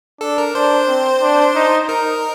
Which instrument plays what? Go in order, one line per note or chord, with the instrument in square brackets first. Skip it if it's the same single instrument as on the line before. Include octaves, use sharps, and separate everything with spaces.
[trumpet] D4 [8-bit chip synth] A4
[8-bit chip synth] A#4
[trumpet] D4 [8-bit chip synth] C5
[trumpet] C4
D4
D#4
[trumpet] D#4 [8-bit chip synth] A#4